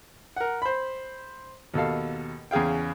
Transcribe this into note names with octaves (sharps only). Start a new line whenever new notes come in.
A#4 F#5
C5 B5
D#2 B2 A4 F5
E2 C#3 G#4 F5 G5